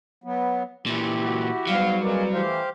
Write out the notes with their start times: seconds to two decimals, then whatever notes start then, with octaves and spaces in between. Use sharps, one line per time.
0.24 F#3 B3
0.86 A#2 E3 E4 G4
1.22 F#4
1.67 G#2 F#3 G3 B3 F5
2.02 C2 G#3 A#3 A#4 B4 D5
2.33 E3 A3 G4 C5 F5